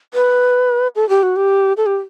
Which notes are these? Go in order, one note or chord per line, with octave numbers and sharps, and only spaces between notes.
B4
A4
G4
F#4
G4
A4
G4